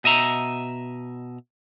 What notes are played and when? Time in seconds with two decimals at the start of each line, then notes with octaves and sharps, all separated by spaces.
0.04 B2 D#5 E5 A#5